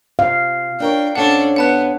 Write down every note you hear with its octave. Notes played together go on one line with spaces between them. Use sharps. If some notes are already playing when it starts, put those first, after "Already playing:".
C3 F5
D4 A#4 C#5 G5
G#2 C#4 D4 A4 C#5 F#5
B3 F#5 A5 F#6